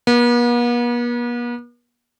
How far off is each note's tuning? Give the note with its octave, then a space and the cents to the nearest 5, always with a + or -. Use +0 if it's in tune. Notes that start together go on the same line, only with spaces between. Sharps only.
B3 -45